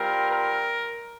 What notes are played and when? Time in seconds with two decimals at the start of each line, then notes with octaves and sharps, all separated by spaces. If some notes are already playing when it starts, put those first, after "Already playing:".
Already playing: G3 C4 F4 A#4
0.30 A#4